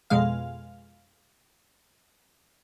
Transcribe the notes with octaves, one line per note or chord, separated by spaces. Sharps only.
F2 B2 G#3 F5